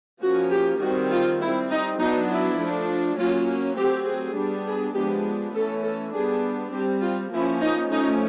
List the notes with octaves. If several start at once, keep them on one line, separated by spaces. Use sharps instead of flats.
F3 A#3 C#4 F#4
G4
D#3 G3 C4 F#4
F4
G3 C4 E4
D#4
F#3 B3 D4 D#4
E4
F3 A3 D4
F#3 A#3 C#4 F4
F#3 A3 C4 G4
G#4
G3 B3 D4
G#4
F3 G#3 B3 D4 G4
E3 A3 C#4 A4
A4
G3 B3 D4 G#4
G3 C4 G4
F4
F3 A#3 C#4 E4
D#4
F3 A3 C#4 D#4